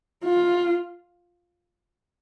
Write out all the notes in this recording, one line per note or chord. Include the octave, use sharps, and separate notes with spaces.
F4